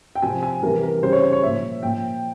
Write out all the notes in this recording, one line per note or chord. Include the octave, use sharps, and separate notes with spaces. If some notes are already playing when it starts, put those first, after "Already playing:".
G5
C3 F3 G#5
G#5
C3 E3 G3 A#4
A#4
C#3 G3 C5
C#5
C5
C#5
A#2 F3 E5
A#2 F3 G5